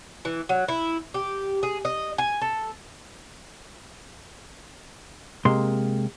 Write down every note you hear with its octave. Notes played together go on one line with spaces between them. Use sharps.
E3
F#3
E4
G4
G#4
D#5
G#5
A4
C3 G#3 A#3 C6